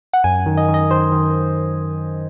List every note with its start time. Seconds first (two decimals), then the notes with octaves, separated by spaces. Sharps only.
0.13 F#5
0.24 F#2 G#5
0.46 D#3
0.57 D#5
0.69 D#3
0.74 D#5
0.91 D#3 C5
1.12 D#3